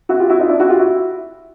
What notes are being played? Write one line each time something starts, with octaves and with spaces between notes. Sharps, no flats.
E4 F#4
F4 G4
E4 F#4
D#4 F4
D4 E4
E4 F#4
F4 G4
E4 F#4